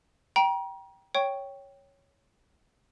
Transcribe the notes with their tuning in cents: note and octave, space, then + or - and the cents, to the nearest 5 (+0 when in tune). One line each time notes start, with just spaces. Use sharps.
G5 -10 A#5 +35
C#5 +0 G5 +0 C#6 +0